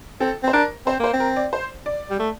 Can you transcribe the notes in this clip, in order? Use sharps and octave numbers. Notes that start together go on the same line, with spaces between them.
C4 A4
C4 C5
D4 A#4
C4 C5
A#3 C5
C4
A#4
D5
C5
D5
G3
A3